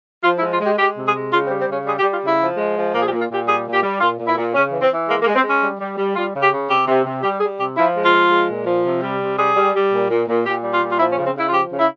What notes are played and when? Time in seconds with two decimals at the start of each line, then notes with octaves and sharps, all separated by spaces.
0.24 F3 F4
0.38 E4
0.42 G#3
0.52 F4
0.61 G#3 G4
0.78 G#3 G4
0.97 C3
1.05 G#4
1.15 G#3
1.32 C#3 F4
1.45 C4
1.50 G3
1.59 C4
1.68 C#3
1.73 C#4
1.86 G3 G#4
1.99 G4
2.03 G3
2.13 F4
2.22 C#3 E4
2.40 F3
2.57 G#3
2.75 F3
2.93 A#2 A#3
3.02 G#4
3.07 G4
3.11 A#2
3.20 F4
3.29 A#2 G4
3.47 G3 G#4
3.66 A#2
3.74 G4
3.83 G3
4.01 A#2 F4
4.19 A#2
4.27 E4
4.37 A#2
4.55 C#3 C#4
4.72 E3
4.81 C4
4.90 E3
5.08 G#3 A#3
5.22 A#3
5.27 G#3
5.35 C4
5.44 G#3 C#4
5.61 G3
5.80 G3
5.98 G3
6.16 G3 F4
6.34 C#3
6.42 G4
6.52 C#3
6.69 C3 G4
6.87 C3
7.05 C3
7.23 G3 G4
7.41 G3 G#4
7.59 C3 G4
7.77 F3 E4
7.95 G#3
8.04 F4
8.13 F3
8.30 G#3
8.48 A#2
8.66 F3
8.84 C3
9.02 G3
9.20 C3
9.38 G3 G#4
9.56 G3
9.75 G3
9.92 A#2
10.10 A#2
10.27 A#2
10.45 A#2 G4
10.64 G3
10.72 F4
10.81 A#2
10.91 F4
10.99 F3 E4
11.13 C#4
11.17 C#3
11.26 C4
11.35 C#3 E4
11.49 F4
11.53 F3 G4
11.71 C#3
11.79 E4